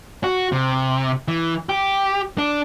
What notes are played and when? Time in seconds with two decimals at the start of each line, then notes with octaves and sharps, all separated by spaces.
0.24 F#4
0.52 C3
1.28 E3
1.69 G4
2.38 D4